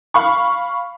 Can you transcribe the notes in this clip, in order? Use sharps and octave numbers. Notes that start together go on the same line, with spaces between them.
F5 B5 C#6